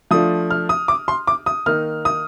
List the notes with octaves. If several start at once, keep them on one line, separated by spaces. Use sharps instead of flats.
F3 A3 D4 F4 D#6
F6
D#6
D6
C6
D6
D#6
D#3 A#3 D#4 F6
D#6